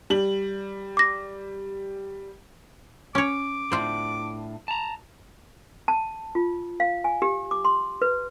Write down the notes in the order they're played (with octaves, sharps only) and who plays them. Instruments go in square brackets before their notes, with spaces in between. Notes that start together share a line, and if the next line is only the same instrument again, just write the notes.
[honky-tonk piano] G3 F#7
[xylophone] D6 A#6
[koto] C#4 C#5 [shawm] D6
[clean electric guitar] A2 D4 [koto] F4 C5
[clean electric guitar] A5 A#5
[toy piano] A5
F4
F5
G#5
G4
D6
C6
B4